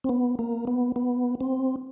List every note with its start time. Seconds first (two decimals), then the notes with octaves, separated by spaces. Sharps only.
0.04 C4
0.09 B3
0.39 A#3
0.67 B3
0.96 B3
1.41 C4